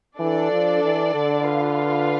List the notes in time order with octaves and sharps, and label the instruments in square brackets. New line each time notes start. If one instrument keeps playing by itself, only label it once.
[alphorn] E3 [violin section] D4 A4 D5
[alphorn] F3
E3
D3
[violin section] F4 B4 F5